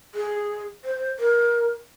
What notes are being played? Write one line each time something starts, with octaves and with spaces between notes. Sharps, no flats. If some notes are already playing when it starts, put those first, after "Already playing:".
G#4
C5
A#4